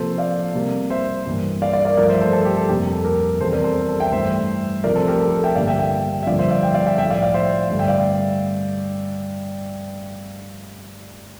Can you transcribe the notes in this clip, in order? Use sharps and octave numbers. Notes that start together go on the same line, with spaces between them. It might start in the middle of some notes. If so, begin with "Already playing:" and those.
Already playing: C3 F3 A#3 A4 C5
D5 F5
C3 G3 A#3
C5 E5
G2 E3 A#3
D5 F5
D5 F5
A#4 D5
G2 F3 A3 A#4 D5
C5 E5
A4 C5
A4
G4
A4
F2 C3 G3 A#3 G4
A4
G4 A#4
E2 C3 G3 A4 C5
A#4 D5
A4 C5
A4
E5 G5
G2 E3 A3 C5 E5
C3 F3 A3 A#4 D5
A4 C5
G4 A#4
A4
A4
E5 G5
G2 D3 G3 A#3 D5 F5
E5 G5
E5 G5
E5
G2 D3 F3 A#3 D5 F5
C5 E5
D5 F5
E5 G5
D5 F5
E5 G5
A2 F3 A3 E5 G5
D5 F5
D5 F5
C5 E5
G2 D3 A3
E5 G5
D5 F5